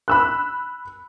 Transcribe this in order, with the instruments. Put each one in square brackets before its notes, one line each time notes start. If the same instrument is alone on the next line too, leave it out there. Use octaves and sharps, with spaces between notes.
[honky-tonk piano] B5 E6 F#6